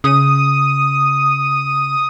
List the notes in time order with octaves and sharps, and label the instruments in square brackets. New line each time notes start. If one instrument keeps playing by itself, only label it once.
[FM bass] C#3 [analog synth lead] D#6